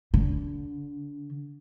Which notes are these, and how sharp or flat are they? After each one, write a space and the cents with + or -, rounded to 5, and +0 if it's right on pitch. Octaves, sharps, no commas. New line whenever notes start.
D3 -30 D4 +0